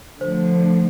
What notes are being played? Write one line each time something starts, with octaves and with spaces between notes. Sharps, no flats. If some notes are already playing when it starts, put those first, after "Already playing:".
D3 F3 A3 C5